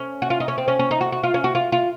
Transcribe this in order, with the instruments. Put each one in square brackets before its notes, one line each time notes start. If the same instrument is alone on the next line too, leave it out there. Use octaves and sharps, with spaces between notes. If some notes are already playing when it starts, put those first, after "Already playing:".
Already playing: [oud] C#4
F#4
F4
D#4
C#4
C4
C#4
C#4
D#4
F#4
F#4
F4
C#4
F#4
F4
F4